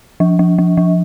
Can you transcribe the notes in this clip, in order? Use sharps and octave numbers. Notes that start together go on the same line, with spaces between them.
F3
F3
F3
F3